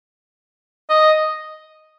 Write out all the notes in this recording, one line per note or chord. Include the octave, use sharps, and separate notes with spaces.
D#5